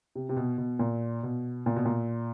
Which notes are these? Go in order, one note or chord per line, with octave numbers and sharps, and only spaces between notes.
C3
C3
B2
B2
A#2
B2
A#2
B2
A#2